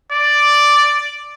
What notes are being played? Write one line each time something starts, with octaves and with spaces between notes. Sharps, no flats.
D5